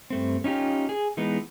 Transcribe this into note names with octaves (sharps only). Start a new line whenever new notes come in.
G2 A3 C4
C#4 D#4 F4 G4
G#4
E3 G#3 B3 D#4